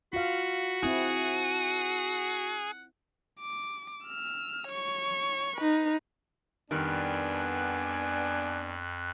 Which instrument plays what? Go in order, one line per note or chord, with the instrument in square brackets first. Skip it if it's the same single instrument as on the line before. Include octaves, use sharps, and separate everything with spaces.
[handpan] F4 F5 [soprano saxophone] F#4 [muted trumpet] B5
[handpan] C4 E4 [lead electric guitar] G#4 [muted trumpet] F#5
[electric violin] D6
E6 F6
C#5 C#6
D#4 B4
[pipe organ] F2 F#6 [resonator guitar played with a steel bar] D#3 G3 [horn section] B3 D4 [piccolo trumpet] G#5